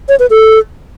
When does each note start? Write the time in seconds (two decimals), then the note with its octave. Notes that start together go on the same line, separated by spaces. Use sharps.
0.09 C#5
0.19 B4
0.30 A4